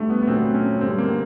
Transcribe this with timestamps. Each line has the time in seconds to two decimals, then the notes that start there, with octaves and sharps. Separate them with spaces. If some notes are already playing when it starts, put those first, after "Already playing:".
Already playing: D2 D3 G3 A3
0.10 B3
0.23 B3
0.27 A#2 F#3 A3 C4
0.54 C#4
0.81 G2 D3 G3 C4
0.98 A#3